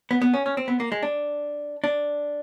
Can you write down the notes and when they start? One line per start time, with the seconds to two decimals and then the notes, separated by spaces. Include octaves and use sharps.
0.11 B3
0.22 B3
0.34 C#4
0.46 C#4
0.57 C4
0.68 B3
0.80 A#3
0.92 G#3
1.03 D4
1.84 D4